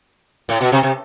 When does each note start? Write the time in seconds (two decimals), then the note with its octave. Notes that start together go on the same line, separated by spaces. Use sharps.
0.49 A2
0.61 B2
0.72 C3
0.83 C3